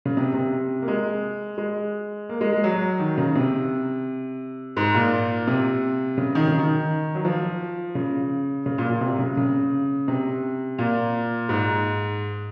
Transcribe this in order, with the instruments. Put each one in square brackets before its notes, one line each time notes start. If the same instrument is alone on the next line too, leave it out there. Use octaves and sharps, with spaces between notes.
[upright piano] C#3
C3
C3
A#3
G#3
G#3
A#3
G#3
G#3
F#3
D#3
C#3
C3
G#2
A#2
C3
C#3
D#3
C#3
D#3
F#3
F3
C#3
C#3
A#2
A#2
C3
C#3
C#3
C3
A#2
G#2